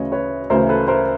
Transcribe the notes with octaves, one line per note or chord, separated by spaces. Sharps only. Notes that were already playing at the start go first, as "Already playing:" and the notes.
Already playing: D2 C#3 E3 C#5 D#5
B4 C#5
D2 C#3 E3 A#4 C5
A4 B4
A#4 C5